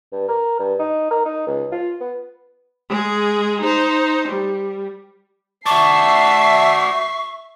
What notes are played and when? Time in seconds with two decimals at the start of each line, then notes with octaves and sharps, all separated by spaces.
0.12 G2
0.28 A#4
0.59 G2
0.79 D#4
1.11 A#4
1.25 D#4
1.47 C#2
1.72 F4
2.00 B3
2.90 G#3 G#4
3.62 D#4 C5
4.28 G3
5.66 F#4 D5 E5 A5 C#6 C7